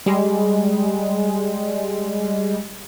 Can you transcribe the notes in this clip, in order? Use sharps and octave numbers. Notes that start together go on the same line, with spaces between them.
G3 G#3